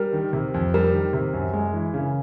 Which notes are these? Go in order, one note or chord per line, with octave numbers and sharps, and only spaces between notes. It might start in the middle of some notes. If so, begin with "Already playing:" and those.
Already playing: G3 A#4
D#3
C3
F2
G3 A#4
D#3
C3
F#2
G#3
E3
C#3